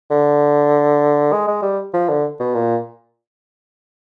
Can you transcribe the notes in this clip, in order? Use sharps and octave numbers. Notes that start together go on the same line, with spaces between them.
D3
G#3
G#3
G3
F3
D3
B2
A#2